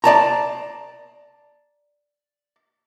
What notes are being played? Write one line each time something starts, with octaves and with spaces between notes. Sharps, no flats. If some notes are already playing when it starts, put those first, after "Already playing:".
D5 A5 A#5